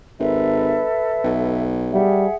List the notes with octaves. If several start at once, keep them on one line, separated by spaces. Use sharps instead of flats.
G#1 A4 B4 E5
B1
G3 G#4 E5 F#5